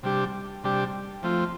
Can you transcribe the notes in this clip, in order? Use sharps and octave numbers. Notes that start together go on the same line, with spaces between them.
C3 G3 D4 G4
C3 G3 D4 G4
F3 A3 C4 F4